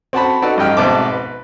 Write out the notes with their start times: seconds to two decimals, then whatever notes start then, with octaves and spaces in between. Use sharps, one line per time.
0.13 C4 F#4 A5 B5
0.42 D#4 F#4 A4 B4 D5
0.57 A1 G2 G4 D#5 G5 F6
0.77 G#1 B2 C4 E5 A5 D6
1.12 B4